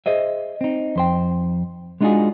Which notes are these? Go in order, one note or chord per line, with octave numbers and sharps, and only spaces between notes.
G#4 C5 D#5 E5
C4 D#4
F2 C5 G5
G#3 D4 D#4 F4 F#4 G#4